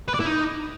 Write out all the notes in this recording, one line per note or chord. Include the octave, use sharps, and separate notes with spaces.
B4
D5
E4
D#4